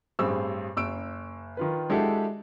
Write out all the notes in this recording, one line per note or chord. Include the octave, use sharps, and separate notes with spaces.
A1 G2 C4 G#4 E6
F#1 E6 D7
D#3 F4 B4
G#3 D4 E4 F#4 G4 A4